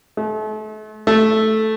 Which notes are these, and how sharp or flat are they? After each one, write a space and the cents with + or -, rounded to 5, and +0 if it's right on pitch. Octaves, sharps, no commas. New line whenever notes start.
A3 -40
A3 -5